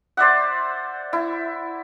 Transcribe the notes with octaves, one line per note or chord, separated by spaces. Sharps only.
C5 D5 E5 F#5
E4